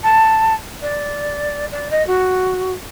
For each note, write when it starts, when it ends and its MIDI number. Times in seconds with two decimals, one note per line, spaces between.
0.03 0.55 81
0.82 1.65 74
1.72 1.88 74
1.91 2.05 75
2.07 2.72 66